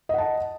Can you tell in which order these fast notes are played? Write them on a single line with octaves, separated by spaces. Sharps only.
D#5 F#5 A5